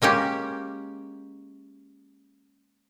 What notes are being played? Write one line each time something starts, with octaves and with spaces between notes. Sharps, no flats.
G#3 A#3 C#4 G4